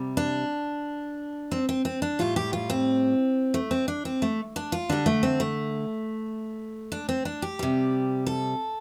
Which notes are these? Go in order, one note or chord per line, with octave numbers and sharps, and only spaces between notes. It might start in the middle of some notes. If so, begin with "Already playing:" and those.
Already playing: C3 G3
D4
C4
C4
C4
D4
A2 G3 F4
G4
F4
C4
A3
C4
D4
C4
A3
D4
F4
D3 G3 D4
A3
C4
A3
D4
C4
D4
G4
C3 G3
A4